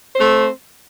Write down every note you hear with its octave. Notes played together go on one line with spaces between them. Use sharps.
A3 C4 C5